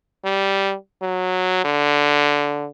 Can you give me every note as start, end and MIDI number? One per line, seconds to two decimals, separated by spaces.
0.25 0.75 55
1.02 1.63 54
1.64 2.68 50